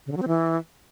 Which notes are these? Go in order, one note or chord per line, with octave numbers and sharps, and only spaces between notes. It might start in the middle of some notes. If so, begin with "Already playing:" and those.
C#3
D3
F#3
C4
E3